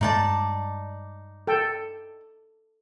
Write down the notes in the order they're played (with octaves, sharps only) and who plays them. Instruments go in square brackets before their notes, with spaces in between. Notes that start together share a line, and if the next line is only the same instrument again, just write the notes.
[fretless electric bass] G2 G#3 [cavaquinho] D#4 D5 A5
[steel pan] A4 G5